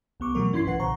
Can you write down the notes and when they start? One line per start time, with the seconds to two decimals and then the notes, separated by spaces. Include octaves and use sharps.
0.20 C2 B3 C#6 D6
0.35 B2 E3 F#3 A3 A#4 C#6
0.53 G2 C#4 E4 C6 G#6 C7
0.65 B1 E3 B4 F#5 C7
0.80 B1 A#2 C#3 C5 A#5 C#6